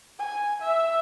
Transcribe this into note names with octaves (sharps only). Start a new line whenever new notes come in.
G#5
E5